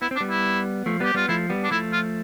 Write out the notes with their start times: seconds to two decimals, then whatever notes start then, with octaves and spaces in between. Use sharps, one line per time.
0.02 B3 E4
0.11 C4
0.16 D4
0.21 G3 B3
0.30 E4
0.86 F3 A3
1.00 G3 B3 G4
1.14 G3 B3 F4
1.28 F3 A3 E4
1.50 G3 B3
1.64 D4
1.71 F3 A3 E4
1.93 F4